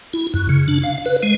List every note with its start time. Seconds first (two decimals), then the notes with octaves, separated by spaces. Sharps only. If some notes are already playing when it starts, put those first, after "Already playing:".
0.13 E4
0.34 F#2
0.49 C#3
0.68 D4
0.83 F5
1.06 B4
1.23 G#3